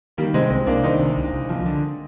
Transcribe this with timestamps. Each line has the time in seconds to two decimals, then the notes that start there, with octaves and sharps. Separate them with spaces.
0.18 D#3 G3 A#3
0.34 C3 G#3 C4
0.50 C2 G#3 C4
0.67 C2 A#3 D4
0.84 D#3 C4 D#4
1.00 C3
1.17 C2
1.33 C2
1.49 F3
1.66 D3